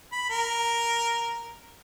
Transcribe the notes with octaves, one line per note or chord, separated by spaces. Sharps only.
B5
A#4